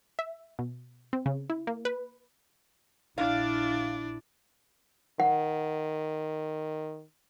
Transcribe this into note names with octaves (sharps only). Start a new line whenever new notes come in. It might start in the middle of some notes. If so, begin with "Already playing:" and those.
E5
B2
C4
C#3
E4
A#3
B4
A#1 D4 E4 D5 F5
D#3 F#5